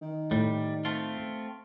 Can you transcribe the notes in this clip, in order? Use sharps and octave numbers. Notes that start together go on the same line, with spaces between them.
D#3
A2 G3
A3 C4 F4